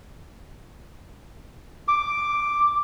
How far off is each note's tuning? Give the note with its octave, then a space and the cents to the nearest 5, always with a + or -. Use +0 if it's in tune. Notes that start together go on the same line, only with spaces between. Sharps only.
D6 +0